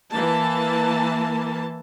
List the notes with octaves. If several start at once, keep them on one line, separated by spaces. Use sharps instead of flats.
E3 A#3 A5